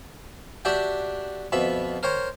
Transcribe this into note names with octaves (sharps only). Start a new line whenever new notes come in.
D4 F#4 G4 D5 E5 G5
F2 B2 E5 B5
A#4 C5 C#5 G5